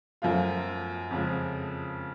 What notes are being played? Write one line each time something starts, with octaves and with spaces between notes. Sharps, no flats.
F#2 F3 A3 F4
F2 C#3 F3 G#3